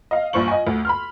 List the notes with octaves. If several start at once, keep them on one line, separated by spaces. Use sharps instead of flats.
D#5 F5
A#1 G2 C5 C#6 F#7
D#5 G#5
D2
B5 C6 F6